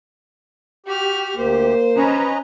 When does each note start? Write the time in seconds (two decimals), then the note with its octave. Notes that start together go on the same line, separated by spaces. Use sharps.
0.86 F#4 G4 F6
1.36 D2 A#3 G4 C5
1.97 C#4 B4 D#5 A#5